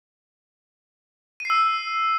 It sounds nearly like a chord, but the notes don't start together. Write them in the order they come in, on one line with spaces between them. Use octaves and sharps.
D#7 C7 E6